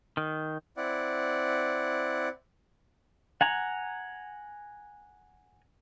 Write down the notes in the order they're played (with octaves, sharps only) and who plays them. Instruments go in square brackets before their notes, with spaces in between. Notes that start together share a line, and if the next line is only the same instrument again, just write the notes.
[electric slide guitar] D#3
[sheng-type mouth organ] C4 E4 D5 F#5
[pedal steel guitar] F#5 G#5 A#5